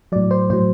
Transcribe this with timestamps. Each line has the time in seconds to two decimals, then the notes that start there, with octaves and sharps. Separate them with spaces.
0.12 A2 F#3 D5
0.31 C5
0.50 A2 F#3 C5